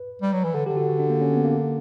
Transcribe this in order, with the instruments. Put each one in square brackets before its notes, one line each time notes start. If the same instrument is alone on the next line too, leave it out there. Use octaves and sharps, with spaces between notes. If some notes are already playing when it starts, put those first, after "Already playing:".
Already playing: [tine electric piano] B4
[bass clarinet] G3
F#3
E3
D3
[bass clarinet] D3 [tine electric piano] G4
[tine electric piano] F#4
F#4
D4
A#3
C#4
B3
A#3